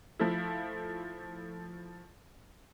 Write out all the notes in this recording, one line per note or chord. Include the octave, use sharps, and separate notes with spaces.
F3 A3 E4